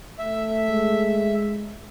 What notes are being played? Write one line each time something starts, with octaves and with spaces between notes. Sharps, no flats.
A3 E5
G#3